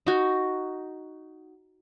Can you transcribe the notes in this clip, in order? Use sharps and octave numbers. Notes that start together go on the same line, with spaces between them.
D#4 F#4